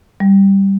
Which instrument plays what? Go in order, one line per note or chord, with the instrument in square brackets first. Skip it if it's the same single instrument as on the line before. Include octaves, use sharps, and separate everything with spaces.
[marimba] G3